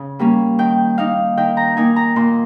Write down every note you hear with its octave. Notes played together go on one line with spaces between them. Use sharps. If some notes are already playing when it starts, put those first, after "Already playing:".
Already playing: C#3
G3 A#3 C#4
D#3 G5
A#3 D#4 F5
D#3 G5
A#5
A#3 D#4 G#5
A#5
A#2 C6